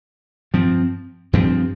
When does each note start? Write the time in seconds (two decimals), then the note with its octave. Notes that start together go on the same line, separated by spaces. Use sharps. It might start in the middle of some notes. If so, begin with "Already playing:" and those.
0.54 G2 F3 C4
1.33 G2 F3 C4